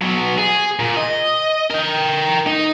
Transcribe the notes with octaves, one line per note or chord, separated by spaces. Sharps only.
F#3 B3
G#4
A#2
D#5
A#4 G5
D#4